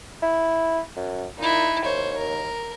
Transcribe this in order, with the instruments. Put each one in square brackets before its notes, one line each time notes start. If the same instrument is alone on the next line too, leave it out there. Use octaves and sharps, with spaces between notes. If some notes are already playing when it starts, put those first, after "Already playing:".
[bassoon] E4
F#2
[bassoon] A#2 [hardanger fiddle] D#4 E4
[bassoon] D#2 [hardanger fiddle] C5 C#5
[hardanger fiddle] A#4